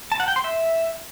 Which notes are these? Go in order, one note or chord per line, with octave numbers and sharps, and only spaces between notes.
A5
F#5
G5
C6
E5